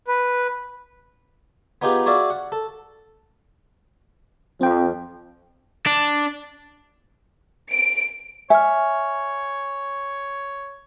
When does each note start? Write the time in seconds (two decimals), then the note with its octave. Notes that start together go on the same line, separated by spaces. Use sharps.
0.08 B4
1.82 B3 D#4 F4 G4 G#4 B4
2.06 F#4 G#4 D5 E5 F5
2.30 F#5
2.52 A4
4.61 F2 F3 C4 G5
5.86 D4
7.72 D7
8.50 C#5 E5 G#5 F6